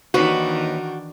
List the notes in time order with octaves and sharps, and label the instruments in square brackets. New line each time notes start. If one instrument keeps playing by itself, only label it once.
[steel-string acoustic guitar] D#2 D#4 B4 [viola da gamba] D#3 E3 D4 [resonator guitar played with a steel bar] F#4